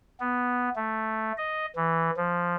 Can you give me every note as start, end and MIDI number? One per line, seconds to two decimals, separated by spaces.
0.20 0.70 59
0.76 1.32 57
1.37 1.66 75
1.76 2.10 52
2.17 2.56 53